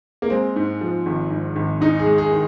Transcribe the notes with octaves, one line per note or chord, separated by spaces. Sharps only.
A#3
G#3 C4
G#2
F3
G#1
G#2
G#1
G#2 D#4
G#4
G#3
G#4
D#3